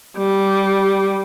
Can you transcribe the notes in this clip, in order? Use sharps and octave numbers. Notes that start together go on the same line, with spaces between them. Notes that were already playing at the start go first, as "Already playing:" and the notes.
G3